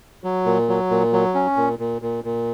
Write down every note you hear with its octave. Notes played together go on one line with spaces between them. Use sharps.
F#3
A#2
F#3
A#2
F#3
C#4
A#2
A#2
A#2
A#2